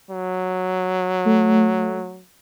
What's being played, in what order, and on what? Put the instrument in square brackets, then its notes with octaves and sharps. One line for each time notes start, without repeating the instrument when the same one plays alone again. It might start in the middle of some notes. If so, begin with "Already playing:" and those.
[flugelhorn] F#3
[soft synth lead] A3